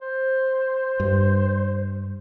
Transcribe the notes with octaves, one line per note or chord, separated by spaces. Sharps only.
C5
G2